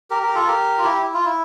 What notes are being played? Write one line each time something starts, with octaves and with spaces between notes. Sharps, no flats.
G4 A#4
G4 A#4
F4 A4
G4 A#4
F4
E4 G4
E4
F4
E4